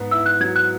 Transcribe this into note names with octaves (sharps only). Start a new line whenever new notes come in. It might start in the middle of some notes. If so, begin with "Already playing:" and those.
Already playing: G#2 B3
E4 E6
F#6
F#3 G#6
F#6